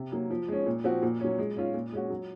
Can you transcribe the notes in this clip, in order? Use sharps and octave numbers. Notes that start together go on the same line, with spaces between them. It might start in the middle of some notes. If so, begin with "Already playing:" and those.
Already playing: C3
F#3 A#3
F3
G#3 C#4
A#2
F3 C4 F#4
A#2
F#3 C#4
G#3
C#4 F4
A#2
G#3 C#4 F#4
F#3